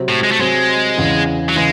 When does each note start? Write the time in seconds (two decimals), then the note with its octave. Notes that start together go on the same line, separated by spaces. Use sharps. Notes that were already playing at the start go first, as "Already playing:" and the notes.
Already playing: C3 F#3 C4
0.09 A2
0.24 G#3
0.31 A3
0.39 C3 F#3 G#3 C4
0.97 E2 C#3 E3
1.49 F#3
1.56 C#3 E3 G#3